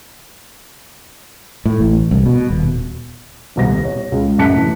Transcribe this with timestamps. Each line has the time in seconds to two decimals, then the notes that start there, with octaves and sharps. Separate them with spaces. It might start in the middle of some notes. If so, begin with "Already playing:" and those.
1.65 A2
1.80 A1
2.11 C2
2.26 B2
2.50 D#1
3.56 D#1 C2 B3 A#6
3.84 C#5
4.12 C#2
4.38 A1 F#2 A5 F#6 B6 C#7
4.54 C3 E3